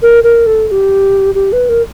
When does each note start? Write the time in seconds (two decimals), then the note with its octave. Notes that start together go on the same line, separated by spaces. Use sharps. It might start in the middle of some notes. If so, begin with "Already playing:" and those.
0.02 A#4
0.24 A#4
0.46 A4
0.68 A4
0.71 G4
1.35 G4
1.52 B4
1.69 A#4